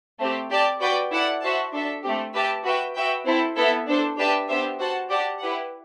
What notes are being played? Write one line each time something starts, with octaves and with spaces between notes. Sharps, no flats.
A3 C4 G4
G4 D5 A5
F#4 B4 D5 G5
E4 A4 D5 F#5
F#4 C5 E5 A5
D4 A4 E5
A3 C4 G4
G4 B4 E5 A5
F#4 B4 E5 G5
F#4 B4 E5 G5
C4 E4 A4 C5
B3 E4 A4 E5
D4 A4 C5
D4 G4 B4 E5 A5
B3 D4 G4 C5 E5
F#4 C5 F#5 A5
G4 D5 F#5 A5
E4 G4 B4 F#5